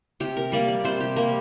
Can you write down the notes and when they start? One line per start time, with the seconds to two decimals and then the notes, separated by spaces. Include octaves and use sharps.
0.20 C3 G4
0.37 A#4
0.52 G3 A#3 D5
0.68 D5
0.84 C3 C5
1.00 G4
1.16 G3 A#3 A#4